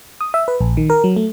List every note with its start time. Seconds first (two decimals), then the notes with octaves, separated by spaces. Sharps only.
0.21 D#6
0.34 E5
0.48 B4
0.61 A#1
0.77 D#3
0.90 A#4
1.04 F#3
1.16 A3